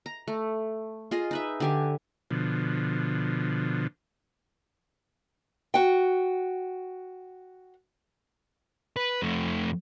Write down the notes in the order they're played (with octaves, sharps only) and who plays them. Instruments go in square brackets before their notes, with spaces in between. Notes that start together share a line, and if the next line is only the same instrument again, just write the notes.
[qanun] A#5
A3
F4 G#4 D#5
D#4 B4 E5
D3 G4 G#5
[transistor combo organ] B2 D3 F3
[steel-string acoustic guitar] F#4 G5
[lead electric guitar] B4
F2 A3